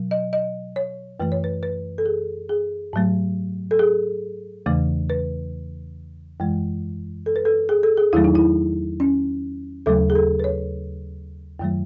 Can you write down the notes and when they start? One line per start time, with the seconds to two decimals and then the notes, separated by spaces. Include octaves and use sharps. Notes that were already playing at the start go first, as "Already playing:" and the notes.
Already playing: B2 F#3
0.11 D#5
0.33 D#5
0.76 C#5
1.20 F#2 E3 A3 B4
1.32 C#5
1.44 B4
1.63 B4
1.98 A4
2.06 G#4
2.49 G#4
2.93 G#2 F#3 A3
3.71 A4
3.79 G#4
4.66 E2 C#3 E3 A3
5.10 B4
6.40 F#2 E3 G#3
7.26 A4
7.36 B4
7.45 A4
7.69 G#4
7.83 A4
7.97 G#4
8.13 E2 D#3 F#3 A3 E4
8.24 D#4
8.35 E4
9.00 C#4
9.86 D#2 C#3 F#3 A3 A4
10.10 G#4
10.15 A4
10.40 B4
10.44 C#5
11.59 F#2 D#3 F#3 A3